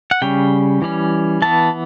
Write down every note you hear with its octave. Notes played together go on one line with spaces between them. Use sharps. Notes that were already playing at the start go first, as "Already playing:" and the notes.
F#5
C#3 G3 C#4 G5
E3 G3 C#4
E3 B3 A5